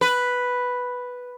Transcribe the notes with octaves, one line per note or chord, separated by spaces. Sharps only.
B4